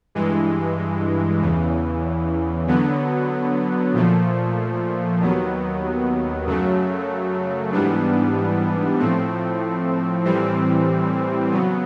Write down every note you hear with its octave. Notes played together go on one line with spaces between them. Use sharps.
G2 E3 G#3
E2 C#3 E3
D3 F#3 B3
A#2 F3 A3
D#2 D#3 F#3 B3
F#2 C#3 F#3 A3
G#2 E3 G3 B3 D4
A2 F3 A3 C4
A2 E3 G3 C4
C#3 F#3 B3